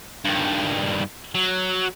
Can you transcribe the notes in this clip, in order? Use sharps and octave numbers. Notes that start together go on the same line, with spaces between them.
G2 D#3
F#3